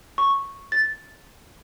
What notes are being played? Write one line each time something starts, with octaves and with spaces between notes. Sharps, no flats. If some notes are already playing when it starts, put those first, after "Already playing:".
C#6
A6